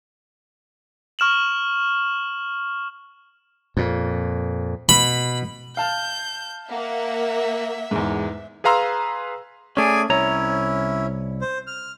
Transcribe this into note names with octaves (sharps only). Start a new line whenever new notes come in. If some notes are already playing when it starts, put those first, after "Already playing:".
C#6 F6 E7 F#7
F2 A#2
B2 B5
F5 A5 F6 G6
A#3 E5 F#5
E2 G#2
G#4 B4 F5 A#5 C6 E6
A3 C#4 G#4 D5 G#5
C2 C#4 E4 C#5 A#5
C5
F6